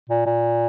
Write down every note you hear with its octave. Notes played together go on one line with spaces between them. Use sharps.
A#2
A#2